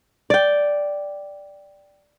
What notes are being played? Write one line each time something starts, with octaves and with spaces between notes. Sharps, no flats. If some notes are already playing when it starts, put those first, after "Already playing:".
D5 G5